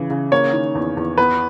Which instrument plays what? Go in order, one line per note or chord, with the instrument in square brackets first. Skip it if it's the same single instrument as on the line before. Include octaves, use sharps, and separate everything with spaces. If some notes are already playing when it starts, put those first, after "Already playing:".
Already playing: [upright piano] C#3 E3
C#3
A#3 C#5
D#3
E2
E2
B3 B4